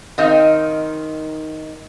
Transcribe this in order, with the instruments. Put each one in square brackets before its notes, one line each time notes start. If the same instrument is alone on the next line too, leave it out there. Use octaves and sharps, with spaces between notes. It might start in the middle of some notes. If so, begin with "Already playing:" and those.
[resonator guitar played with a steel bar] D#3 C4 D#4 D#5 F5